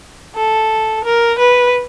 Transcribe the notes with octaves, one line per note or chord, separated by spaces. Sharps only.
A4
A#4
B4